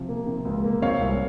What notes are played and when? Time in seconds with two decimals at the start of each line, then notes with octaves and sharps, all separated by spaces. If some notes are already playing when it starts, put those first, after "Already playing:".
Already playing: C3 F3
0.09 A#3
0.27 C3
0.45 C#2
0.64 A#3
0.82 C4 C#5 F5
1.01 C2